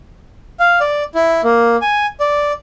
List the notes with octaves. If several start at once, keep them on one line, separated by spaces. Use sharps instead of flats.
F5
D5
E4
A#3
G#5
D5